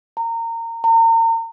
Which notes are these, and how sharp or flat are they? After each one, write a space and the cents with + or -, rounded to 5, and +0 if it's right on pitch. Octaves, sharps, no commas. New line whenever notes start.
A#5 -25
A#5 -40